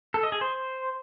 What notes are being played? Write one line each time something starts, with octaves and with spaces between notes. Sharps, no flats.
A4
D#5
G#4
C5